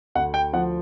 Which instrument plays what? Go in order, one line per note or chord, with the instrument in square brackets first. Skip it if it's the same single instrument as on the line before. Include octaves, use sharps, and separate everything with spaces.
[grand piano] D2 F#5
G5
F3 F#5